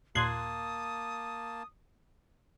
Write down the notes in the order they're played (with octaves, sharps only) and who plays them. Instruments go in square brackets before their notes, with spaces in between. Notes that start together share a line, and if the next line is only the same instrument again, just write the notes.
[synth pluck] D#2 A#2 [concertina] A#3 A5 [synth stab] C6 F#6 G#6 [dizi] D#6